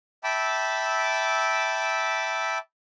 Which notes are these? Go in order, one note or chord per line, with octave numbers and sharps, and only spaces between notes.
E5 G5 A5 B5 D6 E6